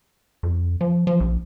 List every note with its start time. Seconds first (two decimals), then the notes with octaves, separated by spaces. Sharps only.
0.43 F2
0.81 F3
1.07 F3
1.20 A#1